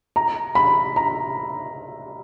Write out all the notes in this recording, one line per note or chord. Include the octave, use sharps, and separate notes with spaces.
A#5
B5
A#5